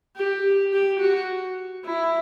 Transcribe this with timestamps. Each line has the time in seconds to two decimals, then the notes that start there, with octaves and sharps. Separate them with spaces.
0.17 G4
0.73 G4
1.00 F#4
1.85 E4